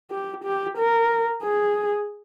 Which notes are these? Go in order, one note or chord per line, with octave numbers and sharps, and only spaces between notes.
G4
G4
A#4
G#4